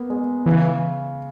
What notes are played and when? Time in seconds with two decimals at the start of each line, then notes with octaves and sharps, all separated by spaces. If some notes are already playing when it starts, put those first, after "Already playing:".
Already playing: A#3 B3
0.10 G#3
0.46 C#3 E3